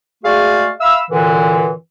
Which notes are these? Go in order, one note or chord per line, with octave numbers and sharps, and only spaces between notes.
G#3 A3 F#4 G#4 D5 F5
E5 F5 B5 E6
F#2 A#2 D3 E3